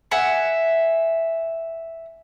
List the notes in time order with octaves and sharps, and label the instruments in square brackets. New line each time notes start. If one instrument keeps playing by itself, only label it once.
[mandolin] E5 F#5 G#5